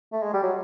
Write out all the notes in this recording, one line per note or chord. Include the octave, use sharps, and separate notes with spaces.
A3
G#3
G3
F#3